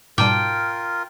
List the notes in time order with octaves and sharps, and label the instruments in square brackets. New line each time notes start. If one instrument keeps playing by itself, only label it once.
[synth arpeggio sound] G#2 B2 G3 [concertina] F4 A#4 [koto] G5 [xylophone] A5 D6